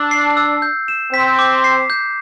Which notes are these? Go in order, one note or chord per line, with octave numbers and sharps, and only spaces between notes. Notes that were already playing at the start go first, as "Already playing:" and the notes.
Already playing: D4 E6
C7
E6
G6
E7
C4 B6
D6
C7
G6